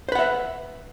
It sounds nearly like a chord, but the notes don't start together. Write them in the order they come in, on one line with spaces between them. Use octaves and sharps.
C5 B4 F#5 E5